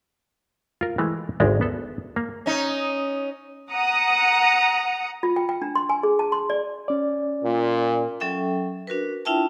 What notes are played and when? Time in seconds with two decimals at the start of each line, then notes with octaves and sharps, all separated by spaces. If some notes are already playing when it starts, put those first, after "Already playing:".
0.81 F4 A#4
0.98 E3 G#3 A3
1.40 G#1 D2 G#3 D4
1.61 B3 A4
2.16 A#3
2.46 C#4 D#4
3.72 F#5 A#5 D#6 C#7
5.23 F4
5.36 G5
5.49 G5
5.62 D4
5.75 C6
5.89 G#5
6.03 G#4
6.19 A5
6.32 C6
6.50 D5
6.88 C#4 D5
7.43 A#2
8.20 F#3 C#4 A4 E5 G5
8.87 D4 F#4 A#4 B4
9.25 D4 E4 F4 E5 G5 A5